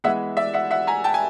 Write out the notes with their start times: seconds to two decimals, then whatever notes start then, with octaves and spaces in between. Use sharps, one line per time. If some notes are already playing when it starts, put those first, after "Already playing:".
0.04 E3 G#3 B3 E5 F#5
0.37 D5 E5
0.54 E5 F#5
0.71 E5 F#5
0.87 G#5 A#5
1.04 G5 A5
1.14 G#5